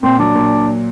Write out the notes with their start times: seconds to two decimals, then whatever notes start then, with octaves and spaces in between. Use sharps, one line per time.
0.03 A#2 C4
0.19 F#3 D4
0.35 A#2